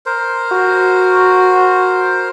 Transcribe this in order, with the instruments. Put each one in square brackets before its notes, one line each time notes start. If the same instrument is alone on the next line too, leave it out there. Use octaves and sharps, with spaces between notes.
[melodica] A#4 C5
[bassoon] F#4